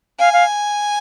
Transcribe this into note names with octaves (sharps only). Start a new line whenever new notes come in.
F5 G#5
F5